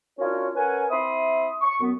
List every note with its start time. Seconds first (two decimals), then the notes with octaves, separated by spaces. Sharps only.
0.19 C#4 D4 F4 F#4 A#4 C#5
0.55 C#4 A#4 B4 F#5 G#5
0.90 C4 E4 E5 B5 C6 D#6
1.61 C#6
1.80 F#2 B3